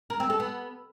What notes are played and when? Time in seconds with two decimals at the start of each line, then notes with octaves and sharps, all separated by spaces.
0.10 A#4
0.20 C4
0.30 A4
0.40 B3